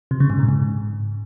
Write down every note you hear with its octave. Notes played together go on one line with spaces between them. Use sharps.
C3
C#3
G#2
A#2
G#2